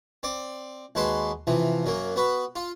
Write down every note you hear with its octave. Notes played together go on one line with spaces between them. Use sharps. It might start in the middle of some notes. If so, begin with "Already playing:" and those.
C4 D5
D#2 G#3 F#4 B4 A5 C6
C3 E3 F3
F#2 F#3 A#3
B3 F#4 B4
F4